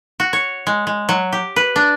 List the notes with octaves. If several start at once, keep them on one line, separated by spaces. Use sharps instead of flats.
F#4
C#5
G#3
G#3
F#3
G4
B4
D4